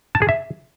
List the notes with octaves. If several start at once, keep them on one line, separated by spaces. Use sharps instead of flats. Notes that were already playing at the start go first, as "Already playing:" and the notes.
A5
G#4
E5